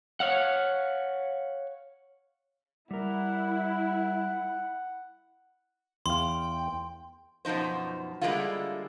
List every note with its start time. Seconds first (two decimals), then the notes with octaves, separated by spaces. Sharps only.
0.20 C#5 F5 F#5
2.91 G3 E4 A#4 F#5
6.06 E2 F5 G5 C6
7.45 F#2 B2 F3 D#4 C5
8.21 D3 G3 G#3 A#3 E4 F4